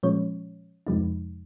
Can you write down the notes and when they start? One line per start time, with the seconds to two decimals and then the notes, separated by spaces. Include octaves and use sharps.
0.03 A#2 F3 G#3 C#4 C#5
0.87 F2 C3 F3 G#3 D#4